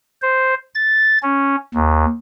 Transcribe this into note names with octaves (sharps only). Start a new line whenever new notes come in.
C5
A6
C#4
D#2